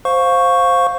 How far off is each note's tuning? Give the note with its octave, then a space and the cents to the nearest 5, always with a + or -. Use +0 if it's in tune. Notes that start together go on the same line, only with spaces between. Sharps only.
C5 +0 F5 +20 C#6 +0